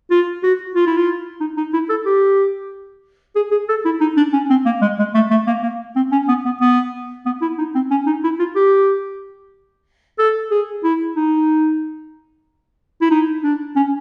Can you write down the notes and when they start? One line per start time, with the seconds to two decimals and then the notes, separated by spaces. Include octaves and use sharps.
0.10 F4
0.43 F#4
0.75 F4
0.87 E4
0.97 F4
1.40 D#4
1.57 D#4
1.73 E4
1.89 A4
2.05 G4
3.35 G#4
3.51 G#4
3.69 A4
3.85 E4
4.01 D#4
4.17 D4
4.33 C#4
4.50 C4
4.65 A#3
4.81 G#3
4.98 G#3
5.14 A3
5.30 A3
5.47 A#3
5.63 A#3
5.96 C4
6.12 C#4
6.28 B3
6.45 B3
6.61 B3
7.26 B3
7.41 E4
7.58 D#4
7.75 C4
7.90 C#4
8.06 D#4
8.24 E4
8.39 F4
8.55 G4
10.19 A4
10.51 G#4
10.84 E4
11.16 D#4
13.01 E4
13.11 D#4
13.43 D4
13.76 C#4